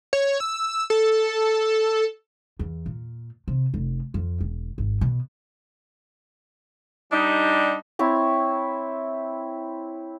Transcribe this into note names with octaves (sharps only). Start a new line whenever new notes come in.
C#5
E6
A4
E2
A#2
C3
F1
F2
E1
G#1
B2
G3 D4 D#4
C4 E4 C#5